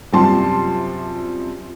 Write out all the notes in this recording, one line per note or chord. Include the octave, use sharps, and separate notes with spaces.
F#2 C3 F3 G3 A5 C6